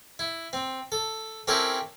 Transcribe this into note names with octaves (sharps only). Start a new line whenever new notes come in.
E4
C4
A4
C4 C#4 E4 G4 A4 A#4